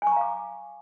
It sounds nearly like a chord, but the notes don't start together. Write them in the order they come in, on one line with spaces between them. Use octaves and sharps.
G#5 C#6 A#5 F5 D6